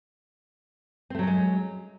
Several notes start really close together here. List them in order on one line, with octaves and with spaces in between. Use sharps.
C4 A3 F#3 C#4 G#3